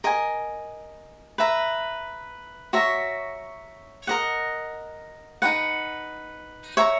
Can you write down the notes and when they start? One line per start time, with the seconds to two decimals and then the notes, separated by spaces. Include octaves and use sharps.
0.04 A#4 D#5 G#5
1.38 B4 E5 A#5
2.73 F#4 C#5 E5 A#5
4.07 A#4 D#5 F#5
5.42 D#4 F#4 B4 F#5
6.77 C#5 E5 A#5 C#6